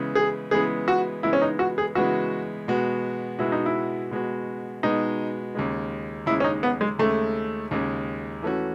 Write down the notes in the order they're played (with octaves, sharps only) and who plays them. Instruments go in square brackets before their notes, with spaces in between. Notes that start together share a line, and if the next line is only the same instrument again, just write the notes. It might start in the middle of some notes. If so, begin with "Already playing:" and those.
Already playing: [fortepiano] C#3 E3 G#3 B3
[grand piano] G#4
[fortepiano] C#3 E3 G#3 B3 [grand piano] G#4
[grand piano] F#4
[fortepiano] C#3 E3 G#3 B3 [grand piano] E4
[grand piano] C#4
D#4
F#4
G#4
[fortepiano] C#3 E3 G#3 B3 [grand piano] F#4
[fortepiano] B2 G#3 B3 F#4
[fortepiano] B2 G#3 B3 F#4 [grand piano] E4
[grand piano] D#4
E4
[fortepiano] B2 G#3 B3 F#4
[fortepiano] B2 G#3 B3 F#4 [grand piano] D#4
[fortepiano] D#2 C#3 G#3
[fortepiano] D#2 C#3 G#3 [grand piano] E4
[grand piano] C#4
D#4
B3
G#3
[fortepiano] D#2 C#3 G#3 [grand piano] A3
[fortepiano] D#2 C#3 G#3
E3 A3 C#4 F#4